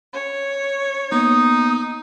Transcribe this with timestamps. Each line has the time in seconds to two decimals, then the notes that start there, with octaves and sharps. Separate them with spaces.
0.13 C#5
1.12 A#3 B3 D#4 D#6